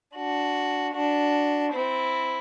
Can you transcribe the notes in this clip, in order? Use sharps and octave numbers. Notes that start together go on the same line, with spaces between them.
D4 F#4
D4 F#4
C4 E4